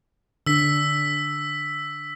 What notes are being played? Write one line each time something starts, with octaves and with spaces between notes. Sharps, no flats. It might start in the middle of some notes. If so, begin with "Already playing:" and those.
D3 D4 E6 B6